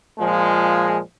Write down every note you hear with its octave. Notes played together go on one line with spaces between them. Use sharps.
A#2 F3 G#3